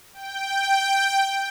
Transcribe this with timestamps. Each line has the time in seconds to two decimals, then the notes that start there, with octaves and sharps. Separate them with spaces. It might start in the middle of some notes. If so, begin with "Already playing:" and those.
0.14 G5